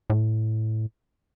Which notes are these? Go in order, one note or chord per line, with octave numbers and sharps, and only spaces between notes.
A2